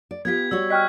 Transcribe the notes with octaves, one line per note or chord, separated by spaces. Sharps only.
D5
B3 F4 G4 G#6 B6
G3 F#4 C#5 E6
D#5 G5 C#6 F6 F#6 B6